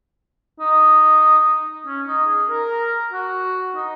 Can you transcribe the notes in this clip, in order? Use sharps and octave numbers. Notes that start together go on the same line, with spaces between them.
D#4
C#4
D#4
G#4
A#4
F#4
D#4